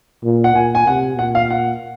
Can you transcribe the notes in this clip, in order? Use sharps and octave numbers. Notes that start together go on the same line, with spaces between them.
A#2
F#5
A#2 G#5
G#5
C3 F#5
A#2 F#5
F5
F#5